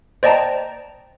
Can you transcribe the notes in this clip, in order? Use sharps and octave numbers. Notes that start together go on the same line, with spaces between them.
C5 D5 D#5 G5 A5 A#5